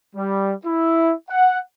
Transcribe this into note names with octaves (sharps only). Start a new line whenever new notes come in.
G3
E4
F#5